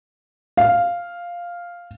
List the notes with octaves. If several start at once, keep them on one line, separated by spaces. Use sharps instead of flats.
F5